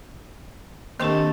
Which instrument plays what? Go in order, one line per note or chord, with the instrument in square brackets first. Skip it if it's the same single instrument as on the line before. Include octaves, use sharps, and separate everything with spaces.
[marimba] D#3 D4 G4 [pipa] A3 C4 [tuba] A#3 [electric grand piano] D#5 E7